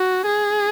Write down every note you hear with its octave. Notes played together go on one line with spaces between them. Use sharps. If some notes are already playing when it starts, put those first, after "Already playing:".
Already playing: F#4
G#4